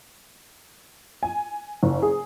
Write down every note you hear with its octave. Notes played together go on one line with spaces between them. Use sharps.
G#5
F#1
G#4